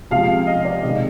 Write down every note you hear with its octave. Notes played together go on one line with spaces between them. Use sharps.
C3 F3 G#3 F5
D#5
D5
C3 D#3 G#3 D#5